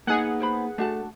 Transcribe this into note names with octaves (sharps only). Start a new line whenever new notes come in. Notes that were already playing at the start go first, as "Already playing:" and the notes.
A#3 B3 D#4 G#4 F#5
A#4 C5 B5
A3 D4 F#4 A5